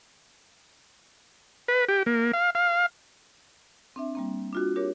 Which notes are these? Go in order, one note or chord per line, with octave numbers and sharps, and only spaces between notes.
B4
G4
A#3
F5
F5
C4 D4 E5
G3 A#3 C4
D4 F4 F#4
D4 G4 A#4 C#5 D6